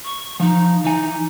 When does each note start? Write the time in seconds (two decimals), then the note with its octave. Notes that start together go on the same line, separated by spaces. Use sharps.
0.04 C#6
0.40 F3 D#4 F5
0.84 E3 D#4 G#5